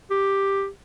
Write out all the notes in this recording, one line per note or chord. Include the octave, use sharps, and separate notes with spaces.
G4